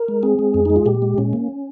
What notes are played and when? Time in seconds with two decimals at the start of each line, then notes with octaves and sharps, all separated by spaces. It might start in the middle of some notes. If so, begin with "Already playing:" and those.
Already playing: A#4
0.08 G#3
0.23 C4 G#4
0.39 G#3
0.54 F2
0.65 G#3 D#4
0.76 F4
0.86 A#2 G4
1.02 G#3
1.18 A#2 C#4
1.33 A#3